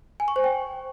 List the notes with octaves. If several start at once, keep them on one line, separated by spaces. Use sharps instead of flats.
G#5
C#6
C5
G5